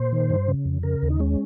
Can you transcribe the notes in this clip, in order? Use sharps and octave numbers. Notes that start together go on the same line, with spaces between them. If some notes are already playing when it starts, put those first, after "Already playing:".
Already playing: A#2 C5
D#3
G2
C#3
F2
C#3 A#4
D#2
D#4
G#3 C#4